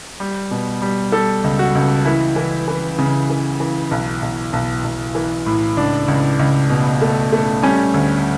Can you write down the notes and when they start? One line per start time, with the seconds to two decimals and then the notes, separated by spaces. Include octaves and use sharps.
0.20 G3
0.51 B2
0.82 G3
1.12 G3 A4
1.44 C#2
1.59 F#4
1.75 C#2
2.05 E3 E4
2.36 E3
2.68 E3
2.99 C#3
3.30 E3
3.60 E3
3.91 B1
4.22 B1
4.53 B1
4.84 B1
5.15 E3
5.46 A2
5.77 C#2 D4
6.08 C#2
6.39 C#2
6.70 B2
7.01 A3
7.32 A3
7.63 G3 C#4
7.94 D2